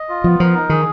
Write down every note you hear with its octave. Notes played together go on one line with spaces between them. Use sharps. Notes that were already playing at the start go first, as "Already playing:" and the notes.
Already playing: D#5
F4
F3 B3
F3 A#4
D#4
D#3 G#4